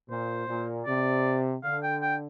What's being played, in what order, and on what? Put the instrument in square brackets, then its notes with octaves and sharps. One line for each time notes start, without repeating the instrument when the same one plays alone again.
[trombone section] A#2 [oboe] C5
[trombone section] A#2
[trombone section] C3 [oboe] D5
[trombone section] D3 [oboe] F5
[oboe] G5
G5